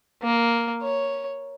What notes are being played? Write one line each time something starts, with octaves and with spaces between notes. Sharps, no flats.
A#3
C#5